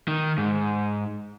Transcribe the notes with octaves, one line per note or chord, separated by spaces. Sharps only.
D#3
G#2